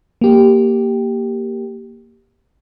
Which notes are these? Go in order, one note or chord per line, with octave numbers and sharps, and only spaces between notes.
A#3 G4